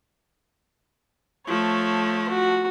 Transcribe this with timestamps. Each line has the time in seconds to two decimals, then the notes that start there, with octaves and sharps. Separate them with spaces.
1.47 F3 A3 C#5
2.29 F#4